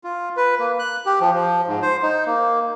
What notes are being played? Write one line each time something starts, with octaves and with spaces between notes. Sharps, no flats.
F4
B4
A#3
F#6
G4
F3
F3
G#2
C5
D#4
A#3